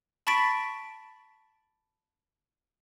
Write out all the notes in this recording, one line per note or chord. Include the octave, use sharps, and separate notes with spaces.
A5 B5 C#6 A6 B6 D7